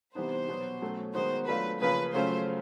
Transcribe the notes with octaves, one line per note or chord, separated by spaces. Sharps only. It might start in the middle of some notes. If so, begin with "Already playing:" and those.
C3 E3 G3 B3 D#4 C5
B2 F#3 B3
B2 F#3 A3 C#4
D#3 G#3 B3 D#4 F#4 C5
F#3 A3 D4 F4 B4
C#3 F3 A#3 C#4 F4 B4
C#3 F#3 A3 C#4 F4 C5